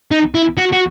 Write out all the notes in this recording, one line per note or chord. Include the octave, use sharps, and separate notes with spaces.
D#4
E4
F#4
F#4